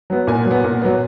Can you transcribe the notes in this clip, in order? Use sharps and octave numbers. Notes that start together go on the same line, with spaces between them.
F#3 B3
A#2 G#5
F#3
B3
A#2
F#3 B3